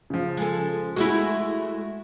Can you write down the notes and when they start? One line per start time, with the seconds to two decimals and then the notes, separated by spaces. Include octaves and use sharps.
0.10 C#3 F3
0.37 G#3 A4
0.96 G#3 A3 E4 F#4